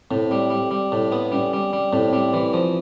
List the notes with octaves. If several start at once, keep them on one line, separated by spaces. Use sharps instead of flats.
A2 C4
G3
G3
G3
A2
B3
G3 C#4
G3
G3
A2 C4
G3
E3
F3